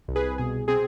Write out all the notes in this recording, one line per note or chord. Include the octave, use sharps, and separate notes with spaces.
C2
G#4 B4
B2 G#4
C4 G#4